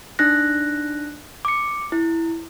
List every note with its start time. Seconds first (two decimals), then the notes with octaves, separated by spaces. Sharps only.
0.19 D4 D#4 F#6 A#6
1.45 D6 C#7
1.92 E4